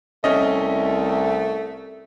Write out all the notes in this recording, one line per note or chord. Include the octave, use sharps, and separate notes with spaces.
C2 A3 C#4 D#5